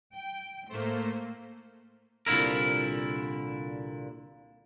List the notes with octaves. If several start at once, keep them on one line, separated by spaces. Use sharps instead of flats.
G5
A2 A3 A#3 C5
C2 A#2 D3 E4 A#4